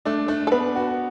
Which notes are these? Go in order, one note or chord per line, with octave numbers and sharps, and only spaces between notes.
A3 D4
A3 D4
A4
B3 B4
F#4